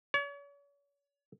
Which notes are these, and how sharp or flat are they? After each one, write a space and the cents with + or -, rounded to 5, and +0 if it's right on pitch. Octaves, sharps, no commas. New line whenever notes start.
C#5 +40